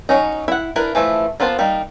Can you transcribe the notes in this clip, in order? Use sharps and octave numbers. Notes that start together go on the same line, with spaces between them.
F#3 C#4 D#4
E4 F#5
D4 E4 A#4 B4
E3 F3 A3 E4
A#3 B3 F4 C5 A5
G3 A#3 D#4